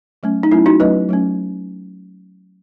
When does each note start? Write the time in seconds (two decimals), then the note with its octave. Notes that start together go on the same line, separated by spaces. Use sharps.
0.23 F#3 A3 C#4
0.43 D#4
0.51 F#3 A3 C#4 E4
0.66 D#4 F#4
0.80 F#3 A3 C#4 B4 D#5
1.09 F#3 A3 C#4